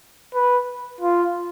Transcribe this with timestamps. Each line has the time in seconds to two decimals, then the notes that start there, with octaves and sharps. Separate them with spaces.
0.35 B4
1.01 F4